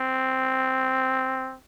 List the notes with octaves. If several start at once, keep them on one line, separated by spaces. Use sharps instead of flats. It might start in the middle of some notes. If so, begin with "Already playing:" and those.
Already playing: C4